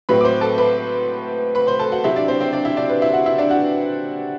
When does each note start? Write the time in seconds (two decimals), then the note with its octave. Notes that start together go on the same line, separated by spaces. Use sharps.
0.09 A2 F#3 C4 B4 B5
0.21 D6
0.25 C5 C6
0.41 A4 A5
0.58 B4 B5
1.55 B4 B5
1.67 C5 C6
1.79 A4 A5
1.92 F#4 F#5
2.04 C3 F#3 C4 E4 E5
2.16 D4 D5
2.28 C4 C5
2.40 C4 C5
2.53 D4 D5
2.65 E4 E5
2.77 D4 D5
2.89 B4
3.02 E4 E5
3.13 F#4 F#5
3.26 E4 E5
3.38 D4 D5
3.51 F#4 F#5